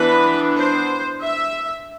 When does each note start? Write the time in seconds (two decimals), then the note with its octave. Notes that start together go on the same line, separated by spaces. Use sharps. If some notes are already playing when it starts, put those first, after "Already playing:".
Already playing: E3 B3 D4 B4
0.57 C5
1.22 E5